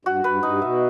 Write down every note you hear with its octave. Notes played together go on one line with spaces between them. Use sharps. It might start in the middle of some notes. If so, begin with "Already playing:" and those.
G2 F#4
G2 B4
G2 D#4
B2 E5